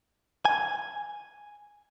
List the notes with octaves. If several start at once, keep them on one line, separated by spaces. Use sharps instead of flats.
G#5